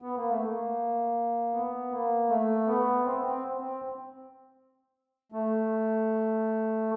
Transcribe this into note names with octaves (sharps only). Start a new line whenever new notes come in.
B3
A#3
A3
A#3
B3
A#3
A3
B3
C4
C4
C4
A3